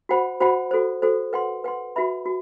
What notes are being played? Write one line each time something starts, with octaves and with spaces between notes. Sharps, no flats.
F#4 C5 F#5 B5
F#4 C5 F#5 B5
F#4 A4 C5
F#4 A4 C5
B4 F#5 C6
B4 F#5 C6
F#4 B4 E5 B5
F#4